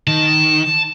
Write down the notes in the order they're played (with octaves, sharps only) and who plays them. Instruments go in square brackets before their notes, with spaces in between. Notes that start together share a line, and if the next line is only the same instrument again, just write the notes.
[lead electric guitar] D#3 [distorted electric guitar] A5